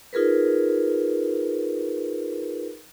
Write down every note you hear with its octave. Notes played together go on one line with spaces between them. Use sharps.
D#4 F4 G#4 A#4 B4